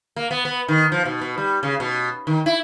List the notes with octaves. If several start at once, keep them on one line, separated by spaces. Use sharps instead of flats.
A#3
B3
B3
D#3
F3
B2
B2
G3
C#3
B2
D#3
E4